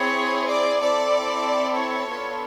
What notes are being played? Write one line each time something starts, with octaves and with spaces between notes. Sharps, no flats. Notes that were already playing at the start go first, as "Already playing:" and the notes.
Already playing: C4 E4 G#4 C#5
D5
C4 E4 A4 D5
C#5
B3 D4 F4 A4